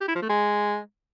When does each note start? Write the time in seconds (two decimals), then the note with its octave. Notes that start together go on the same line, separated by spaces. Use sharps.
0.01 G4
0.08 E4
0.15 F3
0.22 A3
0.29 G#3